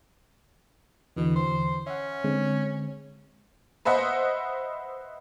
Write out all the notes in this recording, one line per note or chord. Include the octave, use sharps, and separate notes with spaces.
E2 B2 D3 E3
C5
C#4 E5 F#5
D3 G#3 C4
B4 C5 D#5 E5 F#5